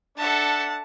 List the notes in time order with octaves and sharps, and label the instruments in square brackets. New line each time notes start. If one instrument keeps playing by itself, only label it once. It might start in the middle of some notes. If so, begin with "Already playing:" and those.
[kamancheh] D4 F#5 [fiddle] A4 E5 [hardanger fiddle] A5